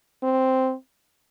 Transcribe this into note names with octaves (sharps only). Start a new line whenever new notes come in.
C4